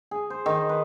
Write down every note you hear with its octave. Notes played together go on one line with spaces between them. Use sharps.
G#4
C5
D#3
B4